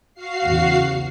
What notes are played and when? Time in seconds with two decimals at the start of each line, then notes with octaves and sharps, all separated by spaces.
0.14 F#4 F5 C7
0.43 E2 C#3